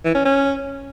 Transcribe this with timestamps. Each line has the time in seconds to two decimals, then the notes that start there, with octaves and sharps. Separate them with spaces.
0.04 E3
0.15 C#4
0.25 C#4